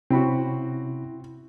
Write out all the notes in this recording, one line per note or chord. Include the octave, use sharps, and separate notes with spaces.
C3 C4 C#4 E4 F#4 B5